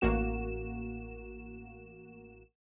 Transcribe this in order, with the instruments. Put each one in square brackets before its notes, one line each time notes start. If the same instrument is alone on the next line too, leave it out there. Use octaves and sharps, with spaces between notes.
[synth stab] A1 A#3 F#4 E7